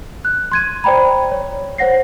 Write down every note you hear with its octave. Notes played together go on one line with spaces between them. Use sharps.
F#6
C6 G#6 D#7
C5 D5 G5 A#5 B5
C#5
C5 C#5 F#5 A#6 C7